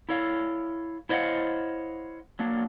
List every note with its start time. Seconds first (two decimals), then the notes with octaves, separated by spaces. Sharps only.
0.09 E4 A4 C#5 F5
1.09 E4 C5 C#5 D#5 F5 F#5
2.39 F#3 A#3 D4